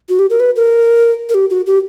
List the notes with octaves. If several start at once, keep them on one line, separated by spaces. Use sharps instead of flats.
F#4
G4
A#4
B4
A#4
A#4
G4
F#4
G4